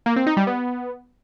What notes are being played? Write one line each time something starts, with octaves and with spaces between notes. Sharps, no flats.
A#3
C4
D#4
G3
B3